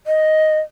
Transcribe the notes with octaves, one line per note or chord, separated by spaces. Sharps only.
D#5